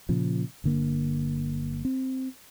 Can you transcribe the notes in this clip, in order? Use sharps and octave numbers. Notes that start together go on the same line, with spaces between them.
A#2 C#3 F3
G1 D3 A#3
C4